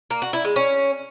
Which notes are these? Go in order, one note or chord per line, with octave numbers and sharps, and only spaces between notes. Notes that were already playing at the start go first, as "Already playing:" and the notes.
A#3
F#4
E4
G#3
C#4